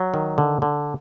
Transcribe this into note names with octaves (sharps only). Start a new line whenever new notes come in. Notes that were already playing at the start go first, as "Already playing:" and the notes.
Already playing: F#3
D#3
D3
D3